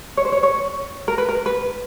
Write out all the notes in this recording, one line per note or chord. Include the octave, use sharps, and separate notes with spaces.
C#5
C5
C#5
C#5
A#4
B4
A#4
B4